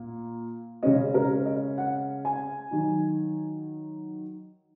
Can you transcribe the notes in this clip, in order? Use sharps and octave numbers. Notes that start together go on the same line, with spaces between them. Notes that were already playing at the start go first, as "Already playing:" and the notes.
Already playing: A#2 A#3
C#3 G#3 C#4 D#5
A#4
D#5
F#5
G#5
D#3 F#3 D#4